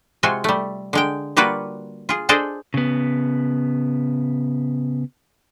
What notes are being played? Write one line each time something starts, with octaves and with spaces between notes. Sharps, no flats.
C3 G#3 F4 F#4 G#5
G3 A3
D3 G#3 G5
G3 A#3 F4 F#4 B4 D5
F4 G#4
D4 G#4 A4 C5 D5 D#5
C#3 B3